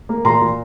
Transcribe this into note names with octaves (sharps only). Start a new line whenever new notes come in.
A#3
A#2 A#5 C6
A#2